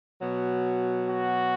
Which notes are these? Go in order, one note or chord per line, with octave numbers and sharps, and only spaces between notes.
B2 F#3
F#4